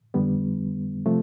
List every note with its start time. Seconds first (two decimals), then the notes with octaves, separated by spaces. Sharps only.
0.14 F2 D3 G3 B3
1.06 C3 F3 A3